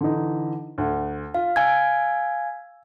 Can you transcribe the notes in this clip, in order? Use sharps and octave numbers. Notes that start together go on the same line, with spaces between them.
D3 E3 D#4
D2 F#5
F4 F5
F5 G#5 E6 G#6